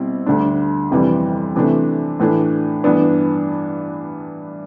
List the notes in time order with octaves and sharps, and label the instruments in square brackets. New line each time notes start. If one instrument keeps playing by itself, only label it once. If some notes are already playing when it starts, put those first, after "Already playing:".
Already playing: [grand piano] B2 G3 C4 E4
D2 D3 G3 D4
F2 C3 E3 G3
C3 E3 A3 D4
A2 E3 A3 D4
G2 E3 B3 D4